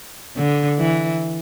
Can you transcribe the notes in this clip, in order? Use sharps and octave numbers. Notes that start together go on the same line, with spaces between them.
D3
E3